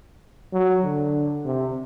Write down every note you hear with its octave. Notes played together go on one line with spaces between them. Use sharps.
F#3
D3
C3